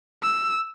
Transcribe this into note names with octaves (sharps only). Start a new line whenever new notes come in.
E6